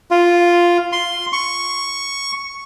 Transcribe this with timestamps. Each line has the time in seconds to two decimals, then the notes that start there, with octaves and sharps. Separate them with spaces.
0.11 F4
0.92 C6
1.33 C#6